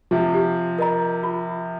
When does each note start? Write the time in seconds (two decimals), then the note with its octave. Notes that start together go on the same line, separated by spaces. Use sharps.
0.11 C3 F3
0.34 G4
0.78 A#4 D#5 A#5
1.23 F4